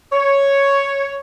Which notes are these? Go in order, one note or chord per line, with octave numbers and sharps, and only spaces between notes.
C#5